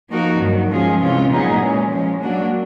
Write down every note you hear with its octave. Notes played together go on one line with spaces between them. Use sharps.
F3 A#3 D#4 F#4 A#4
G2 D#3 F#3
F3 G#3 C#4 F4 G#4
C3 E3 G#3 C#4 F4
A#2 F#3 B3 D#4 G#4
E3 G#3 C#4
F3 G#3 C#4
F#3 A#3 D4 F#4